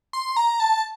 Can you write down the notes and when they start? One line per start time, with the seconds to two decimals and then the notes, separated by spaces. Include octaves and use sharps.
0.13 C6
0.37 A#5
0.60 A5